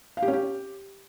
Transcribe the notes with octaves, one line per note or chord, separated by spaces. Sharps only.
F5
G4
C#4
G4